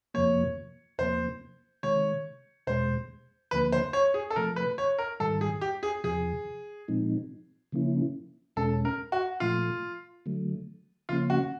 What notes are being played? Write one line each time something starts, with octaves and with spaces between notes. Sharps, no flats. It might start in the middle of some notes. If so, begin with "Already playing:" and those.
F2 C3 F3 A#3 C#5
E2 C3 F3 A#3 C5
C3 D#3 G#3 C#5
E2 B2 G#3 C5
D2 D3 F3 A#3 B4
C5
C#5
G#4
A4
C3 F3 A3 A#4
B4
C#5
A#4
G#2 D#3 G3 A4
G#4
G4
G#4
E2 C3 F3 G#4
A#2 F3 G#3 C4 D#4
C#3 F3 A#3 C#4 E4
E2 B2 G#3 C#4 A4
A#4
F#4
A#2 F3 A3 F4
D3 F#3 A3
C#3 F3 A#3 C#4 F4
F#4